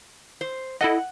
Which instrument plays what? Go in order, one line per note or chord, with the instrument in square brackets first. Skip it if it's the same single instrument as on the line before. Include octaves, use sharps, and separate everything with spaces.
[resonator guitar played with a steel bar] C5
[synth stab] E4 A4 D#5 [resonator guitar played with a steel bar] F#5